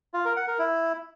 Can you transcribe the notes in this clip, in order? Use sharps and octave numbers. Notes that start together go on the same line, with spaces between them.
F4
A#4
F#5
A#4
E4